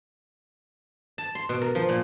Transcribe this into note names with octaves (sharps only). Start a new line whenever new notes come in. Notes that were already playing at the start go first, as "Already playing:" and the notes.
A5
C6
B2
A#4
F3
A#2